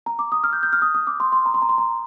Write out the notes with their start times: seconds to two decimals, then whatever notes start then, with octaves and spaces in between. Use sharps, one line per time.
0.06 A#5
0.19 D6
0.32 D#6
0.44 F6
0.53 G6
0.63 G6
0.73 F6
0.82 D#6
0.95 D#6
1.07 D6
1.20 C6
1.32 C6
1.46 A#5
1.54 C6
1.62 A#5
1.69 C6
1.78 A#5